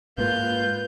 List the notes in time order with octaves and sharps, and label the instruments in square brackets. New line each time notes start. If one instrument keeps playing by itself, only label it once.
[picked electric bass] G#2 G#3 A#3 [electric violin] F4 G6 [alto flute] B4